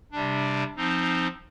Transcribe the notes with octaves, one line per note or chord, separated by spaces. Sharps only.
C3 G3 D4
F3 C4 D#4